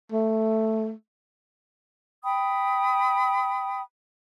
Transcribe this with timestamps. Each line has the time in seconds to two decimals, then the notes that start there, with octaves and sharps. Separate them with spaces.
0.12 A3
2.23 G5 B5 D#6